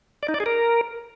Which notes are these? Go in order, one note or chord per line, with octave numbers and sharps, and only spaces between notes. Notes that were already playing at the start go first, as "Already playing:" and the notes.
D5
D#4
D5
G#4
A#4